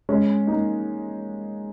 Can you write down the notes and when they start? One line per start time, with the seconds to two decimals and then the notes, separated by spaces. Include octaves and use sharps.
0.09 G#3 C#4
0.47 A#3 D#4